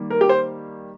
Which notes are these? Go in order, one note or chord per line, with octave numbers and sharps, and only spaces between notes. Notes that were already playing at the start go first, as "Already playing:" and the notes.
Already playing: D#3 G3 A#3
A#4
G4
C5